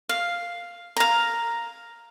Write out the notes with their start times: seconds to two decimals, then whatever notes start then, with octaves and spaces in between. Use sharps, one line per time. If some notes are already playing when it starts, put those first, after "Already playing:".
0.09 F5
0.97 F5 A#5